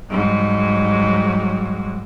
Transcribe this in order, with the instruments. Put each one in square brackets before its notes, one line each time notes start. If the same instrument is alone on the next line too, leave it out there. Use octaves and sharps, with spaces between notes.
[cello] G#2 [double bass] F#3 G3